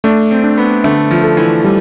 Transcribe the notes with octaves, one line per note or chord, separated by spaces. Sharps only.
A3 D4
C4
D4
B3
D3 A3
F3
A4
E3
G3